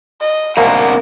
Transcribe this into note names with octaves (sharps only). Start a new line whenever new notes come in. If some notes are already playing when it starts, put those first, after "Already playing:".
D#5
C2 G#2 B2 D3 A#3 C4 F#5 A#5